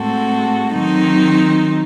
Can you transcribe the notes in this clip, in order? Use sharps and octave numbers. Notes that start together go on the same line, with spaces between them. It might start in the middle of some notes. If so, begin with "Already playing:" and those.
Already playing: A2 G#3 C4 F#4 A4
D#3 F#3 C4 D#4